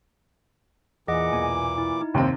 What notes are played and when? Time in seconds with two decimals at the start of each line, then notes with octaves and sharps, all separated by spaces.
1.08 E2 A#2 E3 G#4 D#5 F#5 D6
1.33 B1 E2 A#3 G#5
1.78 E4
2.01 D#4
2.14 F#1 D#2 C3 C4